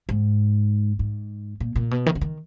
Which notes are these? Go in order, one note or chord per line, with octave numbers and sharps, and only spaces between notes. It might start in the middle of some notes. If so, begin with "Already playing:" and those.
G#2
G#2
A#2
A#2
B2
D#3
C#3
D#3